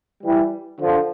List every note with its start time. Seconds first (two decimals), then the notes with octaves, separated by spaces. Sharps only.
0.23 E3 G3
0.80 D3 F3